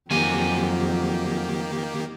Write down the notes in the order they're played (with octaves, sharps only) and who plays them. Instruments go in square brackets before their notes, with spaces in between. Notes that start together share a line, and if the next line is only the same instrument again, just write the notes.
[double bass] F2 [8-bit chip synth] D#3 A#3 G4 [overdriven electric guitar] F#3 G#5